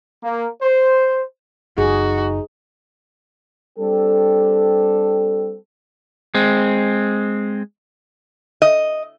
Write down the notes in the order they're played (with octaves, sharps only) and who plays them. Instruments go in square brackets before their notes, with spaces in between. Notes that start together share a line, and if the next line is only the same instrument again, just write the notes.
[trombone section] A#3
C5
[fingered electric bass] F#1 [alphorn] D#4 [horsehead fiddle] F#4 [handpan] G#4
[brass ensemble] G3 C4 D4 G4 A4
[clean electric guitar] G#3 C4
[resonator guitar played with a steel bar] D#5